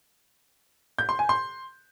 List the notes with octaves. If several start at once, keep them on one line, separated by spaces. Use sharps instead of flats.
G6
C6
G#5
C6